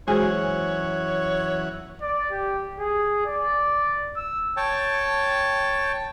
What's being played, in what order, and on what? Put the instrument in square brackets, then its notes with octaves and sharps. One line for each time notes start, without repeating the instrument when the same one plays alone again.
[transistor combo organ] F#2 E3 F#5 [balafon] G#3 F#4 C5 [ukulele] G#4 [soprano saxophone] C#5
[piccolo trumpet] D5
G4
G#4
D5
E6
[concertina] C#5 G5 A5